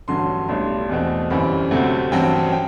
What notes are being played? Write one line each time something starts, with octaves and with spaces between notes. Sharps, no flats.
A1 G2 D3 F#3 C6
B1 A2 G3 D4 C6
E2 B2 A3 C4
G1 F#2 E3 G3 C4 B5
D2 C3 F#3 A3 C4
A1 G2 F#3 C4 G5
G5